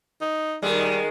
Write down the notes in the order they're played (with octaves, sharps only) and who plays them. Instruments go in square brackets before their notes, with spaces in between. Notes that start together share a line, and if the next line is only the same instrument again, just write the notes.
[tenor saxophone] D#4
[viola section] D#3 [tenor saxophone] G3 [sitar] G#3